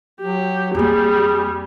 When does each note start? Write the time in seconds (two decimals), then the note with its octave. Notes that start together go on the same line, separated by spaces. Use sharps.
0.21 F#3 G4
0.75 F2 G3 A#3 G#4